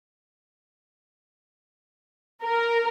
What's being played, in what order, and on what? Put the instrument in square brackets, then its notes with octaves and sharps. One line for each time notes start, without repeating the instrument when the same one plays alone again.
[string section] A#4